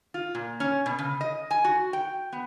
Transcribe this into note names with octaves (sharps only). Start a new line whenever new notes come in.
F4
A#2
C#4
B2
C#3
D#5
G#5
F#4
G5
B3